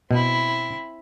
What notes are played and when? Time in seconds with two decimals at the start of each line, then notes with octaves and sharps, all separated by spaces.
0.11 B2 C4 E4